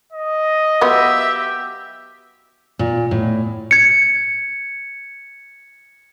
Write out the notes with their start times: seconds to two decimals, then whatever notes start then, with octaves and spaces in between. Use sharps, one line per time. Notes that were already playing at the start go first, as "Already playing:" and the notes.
0.12 D#5
0.81 F#3 B3 F4 G4 E5
2.79 A#2
3.11 A2
3.71 G#6 C#7